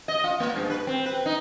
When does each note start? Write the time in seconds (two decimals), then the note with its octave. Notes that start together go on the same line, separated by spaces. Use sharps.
0.08 D#5
0.24 F4
0.40 A#3
0.56 G2
0.70 B4
0.87 C4
1.06 B4
1.26 D#4